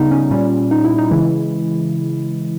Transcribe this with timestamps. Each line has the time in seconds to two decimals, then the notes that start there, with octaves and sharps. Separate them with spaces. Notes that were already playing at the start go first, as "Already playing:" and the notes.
Already playing: C#3 G3 B3 D#4
0.11 C#4
0.31 A#2 G3 C#4
0.71 D#4
0.84 E4
0.98 D#4
1.11 C#3 E3 G#3 E4